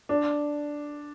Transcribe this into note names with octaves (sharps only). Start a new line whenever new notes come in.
D4